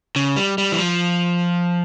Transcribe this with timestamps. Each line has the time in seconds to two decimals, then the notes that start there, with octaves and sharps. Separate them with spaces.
0.16 C#3
0.36 G3
0.58 G3
0.72 E3
0.78 F3